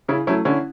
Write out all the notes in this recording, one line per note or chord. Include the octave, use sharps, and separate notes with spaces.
C#3 C#4 E4
F#3 A3 C#4 E4
D3 C#4 E4